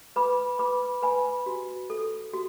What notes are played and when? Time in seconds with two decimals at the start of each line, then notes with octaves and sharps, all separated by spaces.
0.16 B4 B5 D6
0.59 B4 B5 D6
1.02 B4 G#5 B5
1.46 F#4
1.90 A4
2.33 F#4